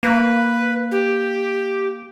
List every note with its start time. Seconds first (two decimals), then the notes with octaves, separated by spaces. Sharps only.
0.03 A#3 B4
0.91 G4